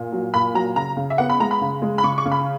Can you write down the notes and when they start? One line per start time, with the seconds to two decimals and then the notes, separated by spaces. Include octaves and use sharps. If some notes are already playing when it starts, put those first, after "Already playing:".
Already playing: A#2
0.12 F#3
0.34 A#2 B5
0.54 F#3 A#5
0.76 C#3 A#5
0.97 C#3
1.10 E5
1.18 B3 F#5
1.29 B5
1.40 G#3 A#5
1.51 B5
1.61 C#3
1.82 G#3
1.98 B5
2.03 C#3 C#6
2.18 C#6
2.25 C#3
2.32 B5